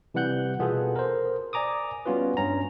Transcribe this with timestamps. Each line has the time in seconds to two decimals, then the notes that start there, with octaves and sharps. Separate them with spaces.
0.14 C3 E3 G3 F#5 F#6 G6
0.59 B2 B3 F4 G#4 A4
0.96 A#4 C5
1.53 D5 G#5 A#5 D6 D#6
2.06 G3 B3 C#4 F4 F#4 B4
2.37 G2 C#4 A#5